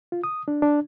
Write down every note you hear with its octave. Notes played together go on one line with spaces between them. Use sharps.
F4
D#6
D4
D4